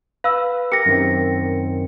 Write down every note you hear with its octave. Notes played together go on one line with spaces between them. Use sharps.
B4 F5 E6
G4 A#4 A#6 C#7
F#2 D#3 C4